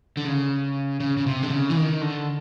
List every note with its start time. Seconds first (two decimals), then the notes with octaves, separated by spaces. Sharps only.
0.17 D3
0.25 C#3
1.00 C#3
1.17 C#3
1.26 C3
1.42 D3
1.50 C#3
1.70 E3
1.76 D#3
2.01 D3